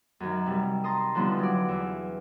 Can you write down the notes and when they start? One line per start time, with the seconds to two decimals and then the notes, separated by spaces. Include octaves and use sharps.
0.20 F#2 D#3
0.46 C3 G3
0.84 A5 A#5 C6 D#6
1.15 D3 F3 G3 B3 D#4 E4
1.39 F#3 D5
1.68 E2 E5